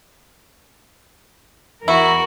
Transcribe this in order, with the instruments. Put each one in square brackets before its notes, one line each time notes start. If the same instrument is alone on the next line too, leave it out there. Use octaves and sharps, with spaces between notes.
[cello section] E2 A#4 [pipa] E4 [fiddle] F#4